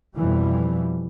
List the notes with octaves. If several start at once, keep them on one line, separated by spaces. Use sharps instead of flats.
F2 B2 E3 F3 G3